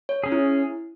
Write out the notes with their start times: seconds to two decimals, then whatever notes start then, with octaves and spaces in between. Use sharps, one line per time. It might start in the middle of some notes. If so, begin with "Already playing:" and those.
0.09 C#5
0.24 C#4 G#4
0.32 E4